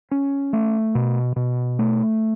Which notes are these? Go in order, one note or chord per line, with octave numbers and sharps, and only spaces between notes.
C#4
A3
B2
B2
A3